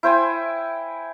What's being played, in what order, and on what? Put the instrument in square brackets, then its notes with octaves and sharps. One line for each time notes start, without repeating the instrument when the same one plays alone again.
[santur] E4 C5 G5 G#5